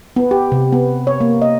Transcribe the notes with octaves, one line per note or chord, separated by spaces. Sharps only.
B3
G4
C3
B3
C#5
A#3
D#5